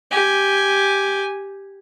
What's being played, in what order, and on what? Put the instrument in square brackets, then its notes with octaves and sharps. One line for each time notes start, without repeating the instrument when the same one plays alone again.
[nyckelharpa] G4 G#5